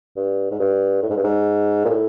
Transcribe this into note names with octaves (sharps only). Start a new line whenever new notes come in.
G2
G#2
G2
A2
G#2
G2
G#2
A#2
A2